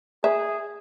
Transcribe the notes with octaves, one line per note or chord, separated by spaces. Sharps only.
G#4 E5